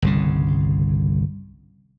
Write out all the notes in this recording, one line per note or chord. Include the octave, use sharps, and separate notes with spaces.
G1 C2 C#3